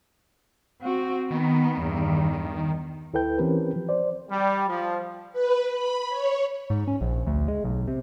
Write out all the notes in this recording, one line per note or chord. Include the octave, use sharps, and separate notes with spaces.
C4 F#4
D#3 B3
E2 G2
D2 E4 A4 B4 G5 G6
E3 C4 C#4 G4 A#4 B4
F3
C5 D5
G3
F3
B4
B5
C#5
G#2
C#4
A#1
D2
G#3
B1
C3